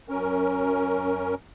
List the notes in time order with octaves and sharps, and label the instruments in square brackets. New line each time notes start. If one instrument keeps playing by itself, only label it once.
[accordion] F#2 C#4 A#4